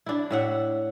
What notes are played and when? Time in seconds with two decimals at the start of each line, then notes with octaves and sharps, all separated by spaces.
0.06 D4 E4
0.31 A2 E5 F#5